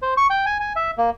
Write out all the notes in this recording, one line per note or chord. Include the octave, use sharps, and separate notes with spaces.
C5
C#6
G5
G#5
G#5
E5
A#3